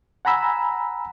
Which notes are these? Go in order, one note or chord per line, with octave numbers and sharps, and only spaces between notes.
F#5 G#5 A#5 B5 E6